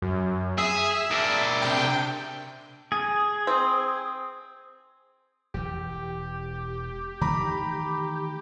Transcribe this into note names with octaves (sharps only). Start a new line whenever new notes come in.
F#2
G#4 E5
D4 A#4
C3 G5
G#4
C4
E1 E3 G4
D#3 E3 A3 A#5 B5 D6